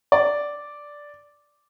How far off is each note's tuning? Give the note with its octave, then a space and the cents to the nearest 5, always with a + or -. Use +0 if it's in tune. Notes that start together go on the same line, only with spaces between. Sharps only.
D5 -5